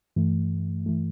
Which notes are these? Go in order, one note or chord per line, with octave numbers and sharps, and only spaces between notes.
G2 E3 A3
E3 A3